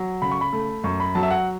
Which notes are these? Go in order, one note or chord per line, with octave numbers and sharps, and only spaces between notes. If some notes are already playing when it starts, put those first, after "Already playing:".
Already playing: F#3
C#3 B5
C#6
B5
A3
F#2 C#6
B5
F#3 A5
E5
F#5